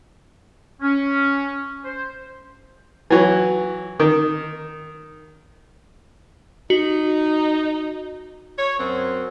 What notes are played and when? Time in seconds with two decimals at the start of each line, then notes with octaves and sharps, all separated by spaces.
0.82 C#4
1.85 C5
3.10 E3 F#3
4.00 D#3
6.70 D#4 F#4
8.58 C#5
8.79 F#2 C4